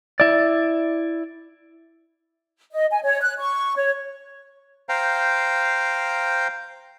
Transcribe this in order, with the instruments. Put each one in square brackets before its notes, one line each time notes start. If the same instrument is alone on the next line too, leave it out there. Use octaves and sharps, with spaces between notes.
[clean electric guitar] E4 D5
[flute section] D#5
G#5
C#5
F#6
C#6
C#5
[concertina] C5 F5 G5 A#5